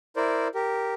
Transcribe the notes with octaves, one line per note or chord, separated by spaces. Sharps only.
E4 A#4 C5 D5
G4 A#4